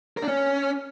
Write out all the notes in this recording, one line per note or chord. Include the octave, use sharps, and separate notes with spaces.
A#4
D4
C#4